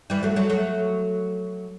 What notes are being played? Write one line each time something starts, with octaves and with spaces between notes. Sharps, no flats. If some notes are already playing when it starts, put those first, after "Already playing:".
E3 G3
F#3 A3
F#3 A3
F#3 A3